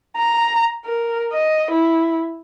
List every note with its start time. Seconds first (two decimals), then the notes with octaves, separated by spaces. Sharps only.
0.17 A#5
0.85 A#4
1.33 D#5
1.71 E4